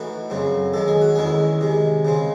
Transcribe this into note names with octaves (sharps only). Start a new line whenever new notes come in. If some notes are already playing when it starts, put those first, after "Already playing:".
Already playing: A2 E3 A3 D#4 F#4
F#2 C#3 F#3 C4
D#3 G#3 C#4 A4
G#4
F#4
E2 D#3 G#3 C#4 E4 G#4
C3 D#3 G#3
C#3 G#3 C4